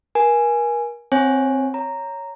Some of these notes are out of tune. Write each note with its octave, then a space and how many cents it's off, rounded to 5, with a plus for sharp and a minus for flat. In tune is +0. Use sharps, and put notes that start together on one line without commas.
A#4 +35 G#5 +0
C4 +0 C#5 -20 G#5 -5
C#5 +0 A#5 -10